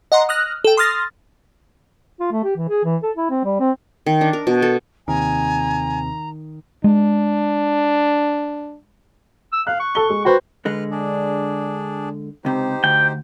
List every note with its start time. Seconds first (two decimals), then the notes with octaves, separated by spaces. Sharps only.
0.12 D#5 F#5 A#5 C6
0.29 D#6 F6 F#6 A#6
0.64 A4 G5
0.77 C6 D#6 F6 A6 A#6
2.20 F4
2.32 A3
2.44 G4
2.57 E3
2.69 G#4
2.85 E3
3.03 A4
3.17 E4
3.30 C4
3.45 G3
3.60 C4
4.06 D#3
4.21 D4
4.33 A#4
4.47 B2
4.62 A4
5.08 D#2 C3 D#3 C4 G#5 A#5
6.84 G#3 D4
9.52 E6
9.67 F5 F#6
9.80 C#6
9.95 A4 G7
10.10 G#3
10.25 F#4 B4 C5 G5
10.65 D3 G#3 B4 F6 F#6
10.91 D4 G#4 D5
12.45 C#2 C3 D#4 G4 C5
12.84 D2 G5